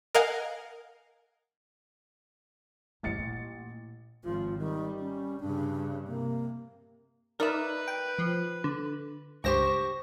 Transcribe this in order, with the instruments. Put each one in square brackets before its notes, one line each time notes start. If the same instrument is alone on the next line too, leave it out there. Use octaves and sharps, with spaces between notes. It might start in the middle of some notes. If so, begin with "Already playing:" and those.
[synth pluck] A#4 D#5 F5 F#5 G#5
[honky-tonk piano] A1 A6 C#7 [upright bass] G2 B2
[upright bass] A#2
[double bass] G#1 F3 [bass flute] F4
[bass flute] D#3 [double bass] G3
[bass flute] C#4
[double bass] G2 C#3 [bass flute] D4
[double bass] C3 [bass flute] A#3
[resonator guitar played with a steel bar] D#4 E5 [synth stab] A#4 D5 [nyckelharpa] B4
[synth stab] G5
F3
D3
[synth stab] C#2 G2 A#6 [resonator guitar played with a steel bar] G4 C5 G5 [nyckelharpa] C#6